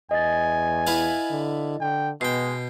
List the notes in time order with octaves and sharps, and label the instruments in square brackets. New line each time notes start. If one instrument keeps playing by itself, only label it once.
[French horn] E2 [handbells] D#5 A6 [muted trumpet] G#5
[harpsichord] E4 B4 F5
[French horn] D3
[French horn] D3 [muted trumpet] G5
[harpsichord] B2 G5 [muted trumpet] G#3 [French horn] B3 [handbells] C7